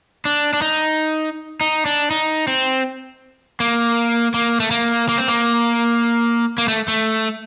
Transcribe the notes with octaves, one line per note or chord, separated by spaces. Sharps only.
D4
D4
D#4
D#4
D4
D#4
C4
A#3
A#3
A3
A#3
A#3
C4
A#3
A#3
A3
A3